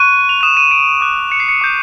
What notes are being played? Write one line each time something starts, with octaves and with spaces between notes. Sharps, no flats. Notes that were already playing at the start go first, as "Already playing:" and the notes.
Already playing: C#6 F#6 D#7
F7
D#6 F#6 E7
D#7
D7
D6 F#6
C#7
C7
C#7
D6 G6